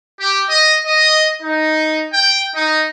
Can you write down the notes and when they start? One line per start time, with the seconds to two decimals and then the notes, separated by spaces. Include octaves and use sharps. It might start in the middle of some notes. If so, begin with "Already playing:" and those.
0.20 G4
0.50 D#5
0.86 D#5
1.42 D#4
2.13 G5
2.55 D#4